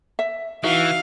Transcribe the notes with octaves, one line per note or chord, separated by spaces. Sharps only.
E5
E3 D#4 F#4 E5 F5